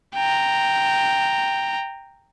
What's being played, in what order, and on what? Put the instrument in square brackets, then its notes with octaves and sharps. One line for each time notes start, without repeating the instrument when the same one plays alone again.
[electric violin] G5 A#5